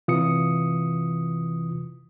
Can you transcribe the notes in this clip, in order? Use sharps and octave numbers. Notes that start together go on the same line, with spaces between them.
C3 E3 F4 D#6 C#7